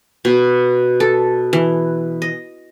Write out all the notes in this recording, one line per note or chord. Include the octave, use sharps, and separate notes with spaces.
B2
A4
E3
D#5